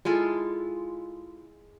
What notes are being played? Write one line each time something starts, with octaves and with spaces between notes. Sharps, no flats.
G#3 E4 F4 A4